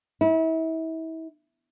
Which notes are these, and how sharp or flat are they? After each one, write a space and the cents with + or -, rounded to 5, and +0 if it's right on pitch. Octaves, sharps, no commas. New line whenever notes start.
E4 -35